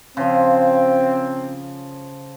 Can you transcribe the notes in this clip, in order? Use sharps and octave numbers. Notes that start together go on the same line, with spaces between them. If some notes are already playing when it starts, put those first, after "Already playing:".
C#3 F3 C4